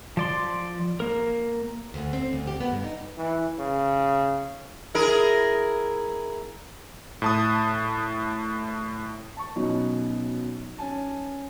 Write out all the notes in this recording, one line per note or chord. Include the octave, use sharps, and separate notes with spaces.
F3 D5 C6
A#3 A#4
D2
C4
D2
G4
B3
G2
D#4
E3
C#3
E4 G#4 A#4
A2 A5 D#6
A5 C#6
B2 F#3 C#4 D#4
C#4 G#5 A5